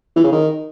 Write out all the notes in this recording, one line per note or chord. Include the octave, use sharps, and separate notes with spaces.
E3
C#3
D#3